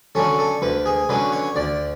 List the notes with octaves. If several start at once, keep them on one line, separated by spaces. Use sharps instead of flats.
D3 F#3 C#4 A4
A4
D2 B4
G#4
D3 F#3 C#4 B4
C#5
D2 D5